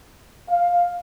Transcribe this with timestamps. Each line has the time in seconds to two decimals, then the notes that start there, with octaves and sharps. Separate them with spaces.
0.49 F5